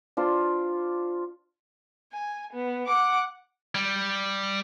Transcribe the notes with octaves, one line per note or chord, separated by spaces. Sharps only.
D4 F4 C5
G#5
B3
F#5 D6
G3